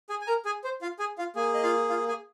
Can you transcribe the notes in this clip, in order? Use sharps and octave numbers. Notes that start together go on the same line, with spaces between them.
G#4 G#5
G#5
A#4 A#5
G#4 G#5
C5
F4 F5
G#4 G#5
F4 F5
A#3 G#4 G#5
D#5
F4 F5
F4 F5
G#4 G#5